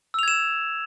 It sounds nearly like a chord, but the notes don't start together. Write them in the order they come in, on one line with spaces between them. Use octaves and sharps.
E6 F7 G#6 E7